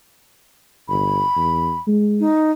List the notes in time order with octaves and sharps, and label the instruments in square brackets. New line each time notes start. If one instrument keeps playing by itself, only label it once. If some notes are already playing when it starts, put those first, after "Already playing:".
[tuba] G1 [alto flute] B5
[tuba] E2
G#3
[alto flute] D#4